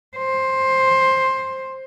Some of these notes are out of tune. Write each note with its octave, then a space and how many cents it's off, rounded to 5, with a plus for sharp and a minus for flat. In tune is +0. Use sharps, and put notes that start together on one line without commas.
C5 +10